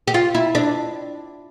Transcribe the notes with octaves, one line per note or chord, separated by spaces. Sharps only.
G4
F4
E4
D4